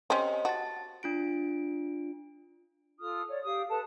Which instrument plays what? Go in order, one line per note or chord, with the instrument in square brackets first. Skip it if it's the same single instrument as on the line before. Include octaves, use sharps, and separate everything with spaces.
[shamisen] C4 C#4 [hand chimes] G4 C5 D#5
[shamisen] F#4 [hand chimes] A5 A6
[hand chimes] D4 F4 D7
[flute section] F4 A4 D#6 F6
C#5 D5
G4 F5 D#6
A4 B4 A5